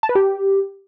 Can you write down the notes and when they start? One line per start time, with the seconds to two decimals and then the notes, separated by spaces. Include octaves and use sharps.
0.03 A5
0.09 B4
0.15 G4